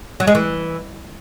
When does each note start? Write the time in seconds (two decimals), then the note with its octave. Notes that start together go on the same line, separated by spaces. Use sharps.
0.20 F#3
0.27 G#3
0.35 E3